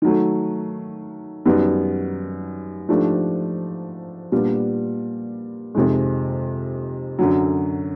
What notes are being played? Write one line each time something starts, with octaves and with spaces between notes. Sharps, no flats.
D#3 F#3 A3
F#2 D#3 G3 B3
G#2 F3 A3 D4 G4
A#2 G3 B3 D4
F2 C3 D#3 G#3
F#2 D3 F#3